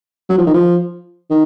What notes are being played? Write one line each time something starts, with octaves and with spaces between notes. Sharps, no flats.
F#3
F3
D#3
F3
D#3